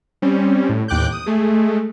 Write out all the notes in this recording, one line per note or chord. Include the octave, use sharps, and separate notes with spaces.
G3 C4 C#4
A2
A1 D#2 G5 D6 F#6 G6
D#6
G#3 A3